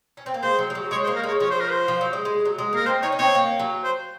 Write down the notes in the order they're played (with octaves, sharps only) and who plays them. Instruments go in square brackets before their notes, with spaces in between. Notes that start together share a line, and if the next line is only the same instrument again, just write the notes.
[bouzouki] C#4
C4
A#3
[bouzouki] G#3 [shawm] C5
[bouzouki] F#3
G#3
F#3
[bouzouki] G#3 [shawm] C#5
[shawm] C5
[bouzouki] A#3
[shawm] A#4
[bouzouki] G#3 [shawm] C#5
[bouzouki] F3 [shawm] C#5
[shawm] C5
A#4
C5
[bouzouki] F3
F#3
G#3
G#3
F#3
G#3
[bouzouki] A#3 [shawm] A#4
[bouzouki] C4 [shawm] C5
[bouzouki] D#4 [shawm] C#5
[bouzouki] C#4
[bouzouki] C4 [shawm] C#5
[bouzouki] A#3
F#3
[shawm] C5